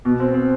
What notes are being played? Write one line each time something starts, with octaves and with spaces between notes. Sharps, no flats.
B2
C4
C4